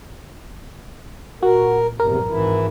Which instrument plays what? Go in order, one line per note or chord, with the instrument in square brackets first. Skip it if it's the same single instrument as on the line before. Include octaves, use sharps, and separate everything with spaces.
[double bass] A#2 [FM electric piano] F#4 [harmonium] A#4
[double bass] A#1 G2 [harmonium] E2 C3 [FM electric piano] A#4
[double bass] G#1 G#2 [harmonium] E3 E4